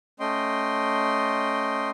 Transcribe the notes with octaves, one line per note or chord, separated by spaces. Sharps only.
A3 C#4 D#5 G5 C6